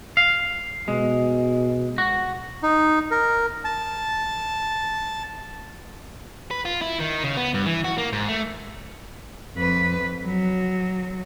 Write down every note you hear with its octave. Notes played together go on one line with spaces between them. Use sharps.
F5
B2 G#3
F#4
D#4
A#4
A5
B4
F4
E4
D#3
C#3
B3
G2
E3
F#4
A#3
G#2
A3
F2 B4
F#3